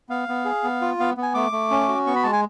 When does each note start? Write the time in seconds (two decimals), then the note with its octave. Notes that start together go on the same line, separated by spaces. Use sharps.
0.09 B3 F5
0.28 B3
0.45 G#4
0.64 B3
0.82 F4
0.99 B3 F5
1.17 B3
1.22 G#5
1.34 A3 D6
1.52 A3
1.71 C#4
1.88 F#4
2.07 B3 C#6
2.16 B5
2.23 G#3 A5
2.33 G#5